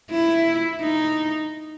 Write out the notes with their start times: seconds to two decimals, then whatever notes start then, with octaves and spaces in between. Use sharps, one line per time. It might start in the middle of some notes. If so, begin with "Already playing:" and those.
0.11 E4
0.81 D#4